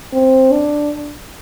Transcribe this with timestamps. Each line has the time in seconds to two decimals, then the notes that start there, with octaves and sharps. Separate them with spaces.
0.13 C4
0.53 D4